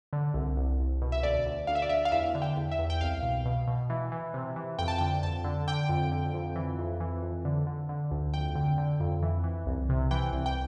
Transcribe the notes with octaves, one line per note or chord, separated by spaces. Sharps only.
D3
C2
C2
C2
B2
E5
D2 D5
D2
D2 F5
E5
D5
D2 E5
F5
E2 E5
D3
G5
E2
E5
E2
G5
C2 F5
B2
B2
B2
E3
E3
C3
E3
F2 G5
A5
D3 G5
F2 A5
D3
D3 G5
F2
D3
F2
E3
F2
E3
F2
D3
D3
D3
D2
F2 G5
D3
D3
F2
E3
E3
C2
C3
E3 G5
C2
G5